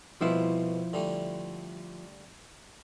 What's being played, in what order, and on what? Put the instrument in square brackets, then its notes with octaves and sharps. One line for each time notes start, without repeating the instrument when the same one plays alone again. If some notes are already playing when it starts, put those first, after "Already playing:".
[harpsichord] C2 B2 [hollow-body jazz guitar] F3 E4
[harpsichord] D3 G3 A3